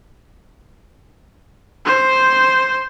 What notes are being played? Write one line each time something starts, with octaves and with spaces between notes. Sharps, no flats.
C5